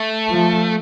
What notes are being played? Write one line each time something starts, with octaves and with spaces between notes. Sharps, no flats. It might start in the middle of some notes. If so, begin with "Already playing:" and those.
Already playing: A3
F3